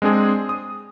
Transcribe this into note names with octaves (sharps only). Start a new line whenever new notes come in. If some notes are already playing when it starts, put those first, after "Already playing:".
G#3 C4 D4 G#4
D#6